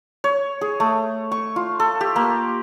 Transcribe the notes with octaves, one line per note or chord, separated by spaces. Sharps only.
C#5
G#4
A3
C#6
F4
A4
G4
A#3